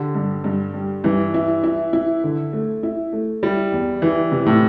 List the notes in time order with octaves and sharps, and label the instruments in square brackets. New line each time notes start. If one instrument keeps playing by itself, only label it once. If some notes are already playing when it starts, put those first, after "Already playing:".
Already playing: [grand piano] D3 [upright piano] G4
[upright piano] G2
G2
G3
[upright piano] G2 [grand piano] E3
[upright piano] E4
E4
E4
D3
A3
E4
A3
[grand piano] G3 [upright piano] E4
[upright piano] E2
[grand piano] E3 [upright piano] E4
[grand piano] C3 [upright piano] E4
[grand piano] A2